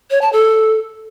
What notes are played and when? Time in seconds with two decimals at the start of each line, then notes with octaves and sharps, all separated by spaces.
0.11 C#5
0.22 A5
0.33 A4